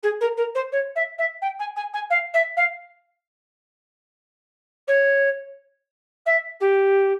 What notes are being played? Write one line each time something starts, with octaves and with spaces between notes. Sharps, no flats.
G#4
A#4
A#4
C5
C#5
E5
E5
G5
G#5
G#5
G#5
F5
E5
F5
C#5
E5
G4